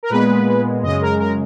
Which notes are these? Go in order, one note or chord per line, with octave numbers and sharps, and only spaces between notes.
A#4
A#2 G#3 B3 B4
F#2 C#3 G#3 D#5
A#4
A#4